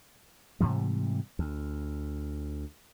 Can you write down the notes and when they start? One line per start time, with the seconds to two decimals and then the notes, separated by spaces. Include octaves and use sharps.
0.60 G#2 C3 E3 G3
1.39 D2